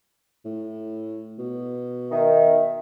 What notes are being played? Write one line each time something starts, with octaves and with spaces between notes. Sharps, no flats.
A2
B2
D#3 E5